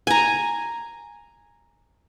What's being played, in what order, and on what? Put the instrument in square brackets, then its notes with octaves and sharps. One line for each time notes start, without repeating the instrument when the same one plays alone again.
[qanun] G#5 A#5